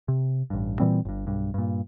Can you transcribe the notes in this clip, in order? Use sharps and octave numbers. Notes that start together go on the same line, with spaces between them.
C3
A1 G2
A#2 E3 G3 C4
G1 G2
B1 G2
G2 A#2